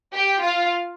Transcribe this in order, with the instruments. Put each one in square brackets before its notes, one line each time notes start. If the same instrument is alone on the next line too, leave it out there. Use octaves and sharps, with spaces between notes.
[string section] G4 G5
F4 F5